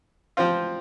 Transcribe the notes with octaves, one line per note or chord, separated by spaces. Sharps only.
F3 C4 F4